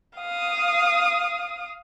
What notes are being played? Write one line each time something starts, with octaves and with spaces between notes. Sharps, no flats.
F5 D#6